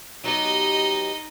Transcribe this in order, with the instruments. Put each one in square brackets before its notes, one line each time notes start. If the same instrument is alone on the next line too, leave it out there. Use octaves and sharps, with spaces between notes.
[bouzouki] F#3 B3 G4 [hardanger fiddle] D#4 D#5